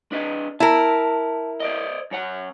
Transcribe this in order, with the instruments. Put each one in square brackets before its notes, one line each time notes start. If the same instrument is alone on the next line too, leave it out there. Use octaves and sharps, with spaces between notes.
[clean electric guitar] D4 B4 D#5
[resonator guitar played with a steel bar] E4 A#4 [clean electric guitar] A5
[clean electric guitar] C5 D5 D#5
F#2 C#5 F#5